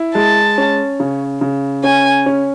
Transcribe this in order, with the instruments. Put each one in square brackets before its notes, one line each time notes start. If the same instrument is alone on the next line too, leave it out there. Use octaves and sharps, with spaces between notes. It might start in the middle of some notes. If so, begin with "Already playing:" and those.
Already playing: [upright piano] E4
[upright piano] G#3 [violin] A5
[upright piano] C#4
C#3
C#3
[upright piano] C#4 [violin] G#5
[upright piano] C#4